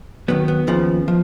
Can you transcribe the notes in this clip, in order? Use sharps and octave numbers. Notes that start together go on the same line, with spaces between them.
D#2 D#3 F#3 B3
B3
D#2 C#3 F3
F3